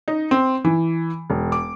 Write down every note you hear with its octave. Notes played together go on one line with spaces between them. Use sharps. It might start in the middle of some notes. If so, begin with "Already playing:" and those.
D#4
C4
E3
E1
D6